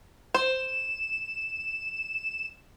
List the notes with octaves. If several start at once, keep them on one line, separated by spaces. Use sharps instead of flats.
C5 E7